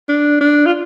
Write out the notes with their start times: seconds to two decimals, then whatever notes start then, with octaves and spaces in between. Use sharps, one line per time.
0.09 D4
0.41 D4
0.66 F4